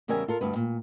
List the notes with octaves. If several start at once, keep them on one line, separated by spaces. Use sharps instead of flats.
E2 C#3 G3 A#4 E5 G#5
F4 A4 A#4
D2 G2 B4
A#2